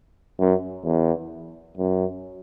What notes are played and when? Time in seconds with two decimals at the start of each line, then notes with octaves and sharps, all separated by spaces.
0.40 F#2
0.85 E2
1.77 F#2